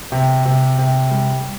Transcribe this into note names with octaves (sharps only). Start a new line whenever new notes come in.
C3
C3
C3
G3